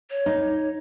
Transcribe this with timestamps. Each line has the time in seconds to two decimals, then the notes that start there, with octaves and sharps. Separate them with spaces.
0.10 C#5
0.26 D#4